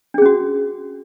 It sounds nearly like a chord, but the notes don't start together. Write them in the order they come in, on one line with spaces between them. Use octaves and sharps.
D4 G#4 C#4 F#4